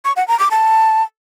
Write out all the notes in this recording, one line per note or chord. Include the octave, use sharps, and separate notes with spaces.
C#6
F#5
A#5
D6
A5